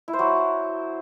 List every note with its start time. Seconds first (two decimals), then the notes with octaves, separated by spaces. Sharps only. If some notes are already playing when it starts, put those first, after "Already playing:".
0.08 E4
0.13 C5
0.19 F#3